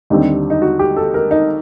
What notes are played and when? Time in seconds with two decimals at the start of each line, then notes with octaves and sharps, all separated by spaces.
0.10 D#2 D3 G3 C4 D#4
0.50 D#4
0.62 F#4
0.79 G4
0.97 A4
1.14 A#4
1.31 D#4